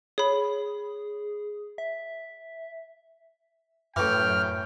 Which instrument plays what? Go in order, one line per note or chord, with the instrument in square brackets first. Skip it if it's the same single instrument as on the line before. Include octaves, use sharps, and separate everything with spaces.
[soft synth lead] G#4 [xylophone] C#5 B5
[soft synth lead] E5
[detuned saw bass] F#2 [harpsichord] A2 E3 [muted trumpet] G5 [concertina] F6